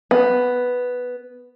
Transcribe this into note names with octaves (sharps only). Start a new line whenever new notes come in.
B3